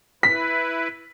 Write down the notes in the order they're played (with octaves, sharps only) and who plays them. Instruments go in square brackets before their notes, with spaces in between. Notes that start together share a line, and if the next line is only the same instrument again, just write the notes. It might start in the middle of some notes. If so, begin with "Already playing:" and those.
[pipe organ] E4 B4 [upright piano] B6